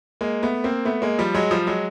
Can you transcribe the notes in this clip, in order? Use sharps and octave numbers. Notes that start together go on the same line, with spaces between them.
G#3 A#3
A3 B3
A#3 C4
A3 B3
G#3 A#3
F3 G3
F#3 G#3
F3 G3
F#3 G#3